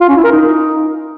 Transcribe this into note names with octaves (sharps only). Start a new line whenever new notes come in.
F4
C#4
E4
A#4
D#4